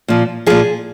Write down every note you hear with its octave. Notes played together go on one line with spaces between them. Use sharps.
A#2 F3
A#2 F3 G#4